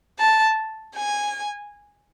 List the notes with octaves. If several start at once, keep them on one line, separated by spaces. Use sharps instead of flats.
A5
G#5